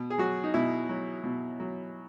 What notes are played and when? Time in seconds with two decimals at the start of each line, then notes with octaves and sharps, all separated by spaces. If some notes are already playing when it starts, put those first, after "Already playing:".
Already playing: B2
0.10 G#4
0.18 F#3 F#4
0.44 D#4
0.54 B2 E4
0.89 F#3
1.24 B2
1.60 F#3